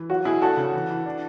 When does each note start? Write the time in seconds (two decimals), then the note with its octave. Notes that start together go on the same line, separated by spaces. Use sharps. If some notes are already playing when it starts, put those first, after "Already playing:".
Already playing: E3
0.09 F#3 F#4
0.25 B2 E4 G#4
0.41 D4 F#4 A4
0.57 C#3
0.74 E3
0.90 E3
1.06 D4